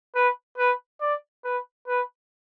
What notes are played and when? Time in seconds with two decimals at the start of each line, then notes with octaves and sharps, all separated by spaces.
0.15 B4
0.58 B4
1.01 D5
1.44 B4
1.88 B4